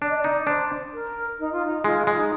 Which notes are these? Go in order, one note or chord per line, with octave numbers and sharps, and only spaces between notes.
D4 D5
D#5
D5
D#4
D4 C5
A#4
D#4
F4
D#4
G#3 F4
G#3
D#4